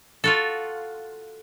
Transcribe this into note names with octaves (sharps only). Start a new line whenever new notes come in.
F4 F#4 A4